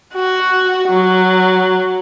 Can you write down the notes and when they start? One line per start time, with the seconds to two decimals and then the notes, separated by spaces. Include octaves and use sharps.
0.14 F#4
0.89 F#3